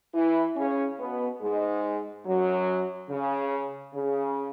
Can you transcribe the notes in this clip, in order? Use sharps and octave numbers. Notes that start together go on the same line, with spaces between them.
E3 E4
C#3 C#4
B2 B3
G#2 G#3
F#2 F#3
C#3
C#3